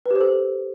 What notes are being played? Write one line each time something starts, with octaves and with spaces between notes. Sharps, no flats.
B4
G4
C5
A4